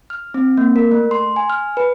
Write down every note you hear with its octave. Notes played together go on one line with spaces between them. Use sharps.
F6
C4
A#3
A#4
A3
C6
G#5
F6
B4